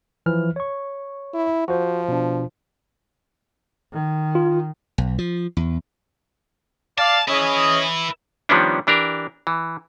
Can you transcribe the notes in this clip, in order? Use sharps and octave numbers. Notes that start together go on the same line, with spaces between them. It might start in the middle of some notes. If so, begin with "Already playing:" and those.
E3 F3 F6
C#5 C#6
E4
F3 F#4 C5
B2 D4
D#3
F4
B1
F3
E2
D5 F5 A5
C#4 E4 G#4 B4 D#5
D#3 F3 G3 B3 C#4 D4
E3 D4 G4 A#4
E3